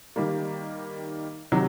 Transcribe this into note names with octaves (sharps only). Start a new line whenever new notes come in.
D#3 G3 A#3
C3 D#3 F#3